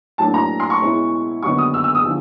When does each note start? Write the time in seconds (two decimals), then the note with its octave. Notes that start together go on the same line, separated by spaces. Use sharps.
0.18 A2 F#3 A#3 D4 A5
0.34 A#5
0.60 C6
0.70 C#6
0.81 B2 G#3 C#4 E4
1.43 D#2 D3 F#3 B3 D#4 C#6
1.58 D#6
1.74 E6
1.84 E6
1.95 D#6
2.05 D3 F3